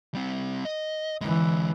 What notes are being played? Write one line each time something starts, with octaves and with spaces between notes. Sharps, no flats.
G3 C4
D#5
D3 E3 G#3